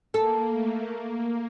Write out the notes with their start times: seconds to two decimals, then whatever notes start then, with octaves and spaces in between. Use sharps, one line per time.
0.14 A#3 A4
0.53 A3
0.90 A#3